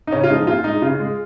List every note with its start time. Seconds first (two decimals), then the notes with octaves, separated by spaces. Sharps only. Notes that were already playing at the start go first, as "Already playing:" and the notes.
0.07 D#4
0.12 C#3 C#4
0.24 F4
0.29 F3 G#3 D#4
0.47 A#2 F4
0.64 G#3 D#4
0.82 C#3 F4
1.00 G#3